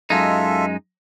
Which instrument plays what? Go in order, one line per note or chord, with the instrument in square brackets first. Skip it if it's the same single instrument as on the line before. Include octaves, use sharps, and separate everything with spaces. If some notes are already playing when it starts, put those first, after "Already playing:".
[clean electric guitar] F#2 G#3 D#4 [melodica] F4 A4 E5